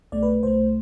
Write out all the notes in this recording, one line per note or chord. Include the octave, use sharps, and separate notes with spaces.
C2 B2 A3 D5
B4
C2 B2 A3 C5